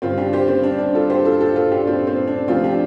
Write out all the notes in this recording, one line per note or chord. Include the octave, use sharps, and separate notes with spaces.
G2 D3 G3 C4 F4
D4 G4
G4 C5
C4
D4
D4
F4 A4
G4 C5
F4 A4
F4 A4
F4 A4
D4 G4
C4 F4
C4
D4
D2 C3 F3 C4 F4
D4 G4